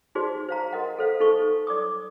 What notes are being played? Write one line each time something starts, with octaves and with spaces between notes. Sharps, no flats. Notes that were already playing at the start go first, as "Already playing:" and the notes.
D#4 F#4 G#4 C5 D5
C5 F5 A#5
F#4 A#4 D#5 F#5
A4 C5 F5
D#4 A4 C5 C#6
D5 D6 D#6